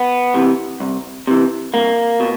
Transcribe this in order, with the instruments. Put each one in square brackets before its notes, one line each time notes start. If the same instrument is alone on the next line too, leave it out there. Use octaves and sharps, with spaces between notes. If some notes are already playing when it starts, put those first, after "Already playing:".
Already playing: [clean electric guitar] B3
C3 E3
C2
C3 E3
C2 A#3
B2